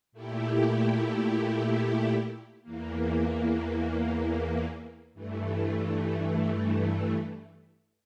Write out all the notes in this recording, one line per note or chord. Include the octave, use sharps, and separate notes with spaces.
A#2 A3 E4 G4
E2 E3 A#3
G2 E3 A3